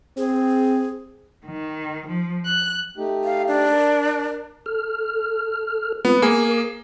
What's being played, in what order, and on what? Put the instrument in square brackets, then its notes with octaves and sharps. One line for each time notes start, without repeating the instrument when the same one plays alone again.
[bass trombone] C4 [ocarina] G#4
[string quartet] D#3
F3
F#6
[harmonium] A3 D#4 G4
[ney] F5
D4
[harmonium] A#4
[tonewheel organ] A4 F6
[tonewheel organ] G#3 C4 F4 [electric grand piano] B3
[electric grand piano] A#3 G#4 [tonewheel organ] A#4 D6